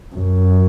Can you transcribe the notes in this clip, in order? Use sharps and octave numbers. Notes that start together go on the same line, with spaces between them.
F#2